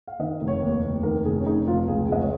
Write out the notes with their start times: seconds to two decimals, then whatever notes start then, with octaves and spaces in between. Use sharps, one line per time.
0.08 F5
0.19 D#3 D#5
0.41 F1
0.47 C#5
0.62 D#2
0.83 F1
1.03 D#3 A#4
1.25 F1 G#4
1.40 C#4
1.46 F1 D#4
1.67 F1 F4
1.87 C#2 G#4
2.09 C#2 D#5
2.21 C#5